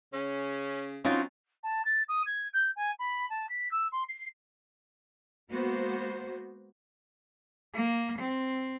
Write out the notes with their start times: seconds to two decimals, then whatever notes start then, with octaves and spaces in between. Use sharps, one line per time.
0.13 C#3 C#4
1.05 F#3 C4 C#4 D#4 F4
1.63 A5
1.85 A6
2.08 D#6
2.26 G#6
2.53 G6
2.76 G#5
2.99 B5
3.30 A5
3.49 B6
3.71 E6
3.92 C6
4.09 C7
5.51 G#3 A#3 B3 F#4 C5
7.74 A#3
8.19 C4